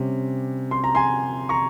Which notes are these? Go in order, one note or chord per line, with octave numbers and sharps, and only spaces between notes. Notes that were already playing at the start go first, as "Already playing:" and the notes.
Already playing: C3 G3 C#4
C6
A#5
G#5 C6
A#5 C#6